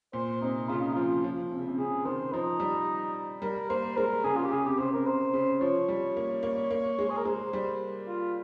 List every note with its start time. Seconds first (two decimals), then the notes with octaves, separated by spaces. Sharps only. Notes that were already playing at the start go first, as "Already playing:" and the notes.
0.13 A#2 C5
0.41 C3 D#4
0.69 C#3 F4
0.81 D#4
0.93 F3 F4
1.24 F3
1.51 C3
1.59 C#3
1.67 C3
1.78 C#3 G#4
2.05 D#3 C5
2.33 F3 D#4
2.60 G3
3.42 G3 A#4
3.70 A#3 C5
3.97 G#3 A#4
4.24 C#3 G#4
4.36 F4
4.44 G4
4.51 C#3 G#4
4.66 C3 G4
4.79 C#3 C5
4.93 C3 A#4
5.06 C3 C5
5.33 C#3
5.61 F3 C#5
5.88 G3
6.17 A#3
6.43 A#3
6.71 A#3
6.99 G#3
7.10 G#4
7.17 A#4
7.25 G#3 C5
7.53 G3
8.07 F4